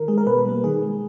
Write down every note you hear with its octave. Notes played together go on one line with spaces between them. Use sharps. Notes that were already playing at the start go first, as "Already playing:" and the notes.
Already playing: D#3 A#4
G#3 G#4
A#4
B2 B4
G3 A#3
D#3 G#4
G#3